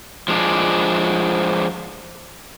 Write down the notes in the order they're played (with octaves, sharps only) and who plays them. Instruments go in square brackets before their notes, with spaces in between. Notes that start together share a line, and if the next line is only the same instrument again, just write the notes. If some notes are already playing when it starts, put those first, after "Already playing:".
[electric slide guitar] F3 G#3 D4